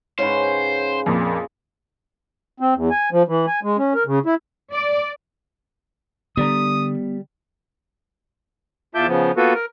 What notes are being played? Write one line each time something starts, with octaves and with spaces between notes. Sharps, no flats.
G#2 C#3 C#4 B4 C5
F2 A#2
C4
E2
G#5
F3
E3
G#5
G#3
C#4
A#4
C#3
E4
D5
D3 G3 B3 D5 A#5 D#6
E2 F4 E5 A5 D6 G6
C#3 F3 B3
A#3 B3 F4 F#4 A4 B4
A#4